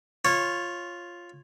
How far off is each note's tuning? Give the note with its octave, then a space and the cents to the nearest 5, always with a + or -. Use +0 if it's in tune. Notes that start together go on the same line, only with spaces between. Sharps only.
F4 +0 C#5 -15